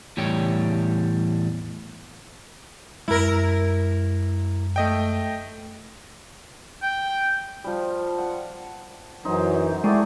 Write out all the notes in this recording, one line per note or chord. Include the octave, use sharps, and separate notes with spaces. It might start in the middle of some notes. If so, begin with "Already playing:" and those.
E2 A2 G3 C#5 G5
F#2 G#3 E4 A#4
A3 D#5 G5
G5
F3 G3
F#5
F#2 E3 F#3 D#4 C5
D#3 G#3 A3 E4 G#4 D5